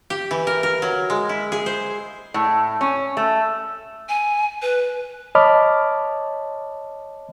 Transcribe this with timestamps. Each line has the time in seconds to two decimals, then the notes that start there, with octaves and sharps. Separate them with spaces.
0.10 G4
0.31 E3
0.47 A#4
0.63 A#4
0.82 F#3
1.10 G#3
1.29 E4
1.52 G#4
1.66 C5
2.34 A2
2.81 C#4
3.17 A3
4.09 G#5
4.62 B4
5.35 C#5 D#5 A5 B5 D6 F6